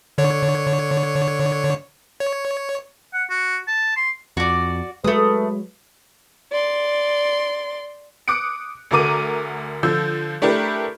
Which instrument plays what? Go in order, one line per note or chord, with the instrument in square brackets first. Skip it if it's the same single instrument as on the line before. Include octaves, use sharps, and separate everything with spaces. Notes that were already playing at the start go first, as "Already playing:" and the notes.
[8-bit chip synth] D3 C#5
C#5
[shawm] F#5
F#4
A5
C6
[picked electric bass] F2 [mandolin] F#4 D5
[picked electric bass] F#3 G#3 [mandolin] A3 D#6 [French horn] B4
[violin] D5 C6
[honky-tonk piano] D6 D#6 F#6 C#7 D7
D2 D3 F#4 A#4 D6 D#7
D3 F3 E6 G6
A3 D4 E4 G4 A#4 B4